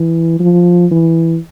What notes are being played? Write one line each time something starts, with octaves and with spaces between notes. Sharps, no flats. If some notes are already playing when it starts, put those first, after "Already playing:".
Already playing: E3
F3
E3